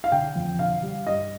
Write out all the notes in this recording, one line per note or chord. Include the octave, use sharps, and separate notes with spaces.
F5
D3 G5
F2
D3 F5
G3
G2 D#5